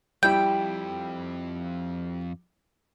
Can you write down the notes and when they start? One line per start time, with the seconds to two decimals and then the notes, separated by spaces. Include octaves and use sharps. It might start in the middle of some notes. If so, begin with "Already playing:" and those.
0.23 F2 G3 E4 G5 G6